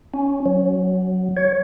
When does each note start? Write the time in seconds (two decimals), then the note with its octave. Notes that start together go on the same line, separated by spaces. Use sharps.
0.14 C#4
0.46 F#3
1.37 C#5